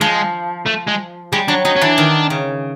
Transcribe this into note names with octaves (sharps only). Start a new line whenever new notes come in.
F3 G#3
A3
G#3
G3 G#3
F#3 D4
F#3 D#4
C#4
E3 D4
D#3
C#3